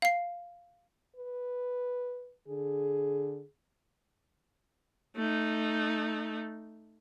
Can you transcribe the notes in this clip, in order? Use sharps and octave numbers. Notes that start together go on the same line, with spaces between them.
F5 C7
B4
D3 G#4
A3 D#4